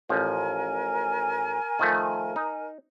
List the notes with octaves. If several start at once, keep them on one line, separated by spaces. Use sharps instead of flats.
A1 F3 A#4 G#5
D#3 F3 A3
D#4